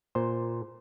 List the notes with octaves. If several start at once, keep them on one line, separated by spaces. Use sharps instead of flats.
A#2 C5